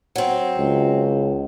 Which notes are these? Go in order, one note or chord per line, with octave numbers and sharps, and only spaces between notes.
F#3 C4
C#2